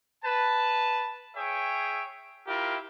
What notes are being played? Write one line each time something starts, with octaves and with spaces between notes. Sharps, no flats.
B4 A5
G#4 C#5 E5 G5
E4 F4 G4 A#4